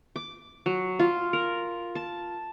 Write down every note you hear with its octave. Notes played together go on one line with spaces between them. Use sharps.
D6
F#3
F4
A#4
A5